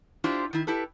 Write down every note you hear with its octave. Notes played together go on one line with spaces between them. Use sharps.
D4 E4 F4 G4 C5
D#3 E4
E4 G4 A4 B4